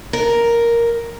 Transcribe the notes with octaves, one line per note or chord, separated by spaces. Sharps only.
A#4